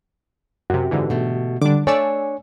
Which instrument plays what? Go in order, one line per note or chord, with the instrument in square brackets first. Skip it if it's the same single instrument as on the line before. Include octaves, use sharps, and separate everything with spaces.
[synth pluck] F#2 C3 [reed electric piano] F#4 G4
[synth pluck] G#2 D3 E3
[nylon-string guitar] B2 A3
[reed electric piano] D3 G3 [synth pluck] D4 D6
[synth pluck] A3 D5 E6 [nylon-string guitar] D4 C#5 [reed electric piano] G#5